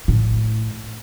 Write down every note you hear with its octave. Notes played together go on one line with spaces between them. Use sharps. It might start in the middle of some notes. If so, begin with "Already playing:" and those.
A2